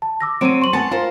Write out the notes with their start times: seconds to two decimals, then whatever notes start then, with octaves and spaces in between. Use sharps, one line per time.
0.02 A5
0.21 D6 E6 A#6
0.41 F#3 C4 D7 D#7
0.62 C6 C#6 F#7
0.73 B3 G#5 A5 A6 C#7
0.91 F4 A#4 C5